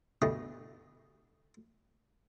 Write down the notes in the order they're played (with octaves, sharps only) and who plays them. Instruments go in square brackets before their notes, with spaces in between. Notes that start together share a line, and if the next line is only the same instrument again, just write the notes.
[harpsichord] D2 G2 B2 A3 D#5